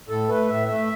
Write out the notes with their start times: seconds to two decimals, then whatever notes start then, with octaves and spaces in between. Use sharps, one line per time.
0.08 A2 A4
0.28 A3 B4
0.49 A2 E5
0.68 A3 E5